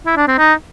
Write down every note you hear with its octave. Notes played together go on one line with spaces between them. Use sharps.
E4
D4
C4
D#4